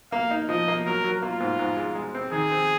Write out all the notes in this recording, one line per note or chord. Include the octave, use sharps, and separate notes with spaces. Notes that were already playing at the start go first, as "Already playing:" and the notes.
A#3 F5
D#4
F3 D#5
A#3
F#3 A#4
F#3
A#3 F4
G#2
G#2
G#3
G#3
C4
D#3 G#4
C4